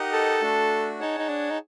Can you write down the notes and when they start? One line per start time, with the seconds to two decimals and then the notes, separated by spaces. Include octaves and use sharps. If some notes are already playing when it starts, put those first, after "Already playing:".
Already playing: D#4 G4 A#4 D#5 F#5
0.13 A4
0.42 A3 D4 F#4
1.00 D#4 G#4 C#5 F#5 A5
1.19 D#4
1.29 D4
1.51 D#4